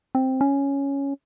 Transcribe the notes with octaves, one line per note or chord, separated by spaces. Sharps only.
C4
C#4